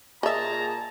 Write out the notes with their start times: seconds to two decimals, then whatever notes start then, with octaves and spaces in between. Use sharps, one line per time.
0.23 A#2 G#4 D#5 E5 A5 A#5